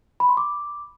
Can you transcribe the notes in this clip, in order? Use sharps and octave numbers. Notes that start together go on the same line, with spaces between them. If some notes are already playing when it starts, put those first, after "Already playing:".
B5
C6
D6